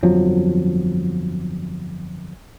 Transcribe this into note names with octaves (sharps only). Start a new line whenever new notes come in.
G1 F2 F3 F#3